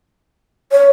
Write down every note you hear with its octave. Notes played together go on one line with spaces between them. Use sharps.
C#5